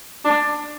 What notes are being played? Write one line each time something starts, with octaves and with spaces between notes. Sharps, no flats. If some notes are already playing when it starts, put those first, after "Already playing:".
D4